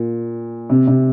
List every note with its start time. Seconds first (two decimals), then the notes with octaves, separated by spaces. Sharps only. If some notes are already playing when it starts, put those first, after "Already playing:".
Already playing: A#2
0.70 C3
0.87 C3